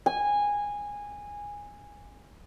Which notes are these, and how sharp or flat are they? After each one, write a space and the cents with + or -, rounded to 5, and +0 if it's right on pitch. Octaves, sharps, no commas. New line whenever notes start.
G#5 -15